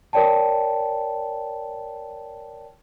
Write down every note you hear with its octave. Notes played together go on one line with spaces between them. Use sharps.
A#4 C#5 D5 G5 A5